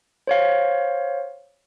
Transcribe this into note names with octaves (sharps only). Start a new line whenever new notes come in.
C5 C#5 F5